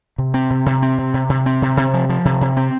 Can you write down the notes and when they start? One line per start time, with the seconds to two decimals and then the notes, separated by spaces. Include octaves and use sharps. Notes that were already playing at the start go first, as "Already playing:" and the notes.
0.18 C3
0.34 C4
0.50 C3
0.66 C3
0.82 C4
0.98 C3
1.14 C3
1.29 C3
1.46 C4
1.62 C3
1.77 C3
1.94 F3
2.09 F3
2.25 C3
2.41 C3
2.57 C4